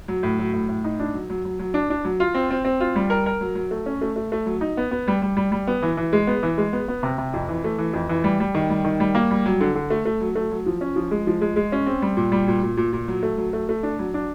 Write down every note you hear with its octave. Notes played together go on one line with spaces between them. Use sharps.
F#3
A2
F#3
A2
A2
D#4
D4
F#3
F#3
F#3
F#3
D4
D4
F#3
F4
C4
C4
C4
F4
G3
A#4
A#4
F#3
F#3
A3
C#4
A3
A3
A3
F#3
D#4
B3
B3
G3
G3
G3
G3
B3
E3
E3
G#3
B3
E3
G#3
B3
B3
C3
C3
F2
E3
A3
E3
F2
E3
G3
G3
D#3
G3
D#3
G3
A#3
G3
F#3
D3
D3
A3
A3
F#3
A3
F#3
F3
C#4
F3
G#3
F3
G#3
G#3
C#4
C4
G3
A#2
G3
A#2
A#2
A#2
A#2
F#3
A3
F#3
A3
A3
D4
F#3
D4